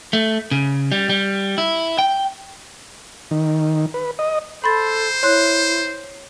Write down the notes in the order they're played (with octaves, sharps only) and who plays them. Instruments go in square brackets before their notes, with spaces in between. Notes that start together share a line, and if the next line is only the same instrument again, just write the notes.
[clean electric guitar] A3
C#3
G3
G3
E4
G5
[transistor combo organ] D#3
B4
D#5
[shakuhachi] A4 [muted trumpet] C5 [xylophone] B5 C6 A6
[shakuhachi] E4 [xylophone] C#5 C6 F#6